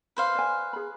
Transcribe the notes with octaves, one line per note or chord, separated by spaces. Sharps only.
B4 C5 F5
D5 G#5
G#4 B5